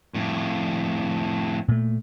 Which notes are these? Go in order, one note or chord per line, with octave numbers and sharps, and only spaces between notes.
F2 A2
A#2 A3